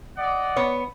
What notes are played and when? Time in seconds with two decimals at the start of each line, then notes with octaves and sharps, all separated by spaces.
0.17 D5 D#5 F#5
0.56 B3 C#5